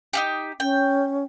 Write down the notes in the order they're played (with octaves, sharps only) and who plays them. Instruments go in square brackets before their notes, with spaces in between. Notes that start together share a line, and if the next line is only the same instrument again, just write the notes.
[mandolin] D#4 F4 G4
[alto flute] C#4 [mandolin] G5